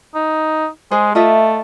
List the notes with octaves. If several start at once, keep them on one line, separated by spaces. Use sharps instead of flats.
D#4
G#3 G#4 C5
A3 F4 D#5 E5